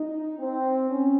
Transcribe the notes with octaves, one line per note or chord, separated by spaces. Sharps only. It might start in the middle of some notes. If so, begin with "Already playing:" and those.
Already playing: D#4
C4
C#4